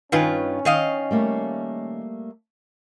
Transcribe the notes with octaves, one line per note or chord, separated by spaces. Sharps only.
G2 D#3 C#4 D#4 F4 B4 G#5
D#3 C#5 D#5 F5
G3 A3 A#3